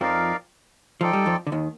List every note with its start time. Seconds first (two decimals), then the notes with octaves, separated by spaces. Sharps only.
0.01 F2 F3 D#4 A#4 D5 F5
1.01 F3 D#4 A4 D5 G5
1.13 G3
1.26 F2 F3
1.47 D3
1.52 D#2 D#3